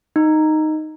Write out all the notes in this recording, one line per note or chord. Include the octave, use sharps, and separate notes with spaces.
D#4